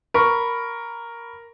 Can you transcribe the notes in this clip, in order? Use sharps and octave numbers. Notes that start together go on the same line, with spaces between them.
A#4 B5 C#6